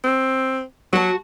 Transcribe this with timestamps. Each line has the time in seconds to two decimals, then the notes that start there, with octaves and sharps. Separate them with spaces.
0.04 C4
0.93 F#3 F#4 A5